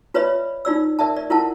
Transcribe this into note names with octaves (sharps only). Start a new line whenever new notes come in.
F4 B4 C#5 D5 E5 B5
D#4 F4 D5 E6
A#4 D5 E5 A5
D5
E4 F4 A#4 F#5 A5